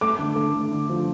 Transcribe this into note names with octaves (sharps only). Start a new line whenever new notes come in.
A3 D6
D3
A3
D3
D3
F3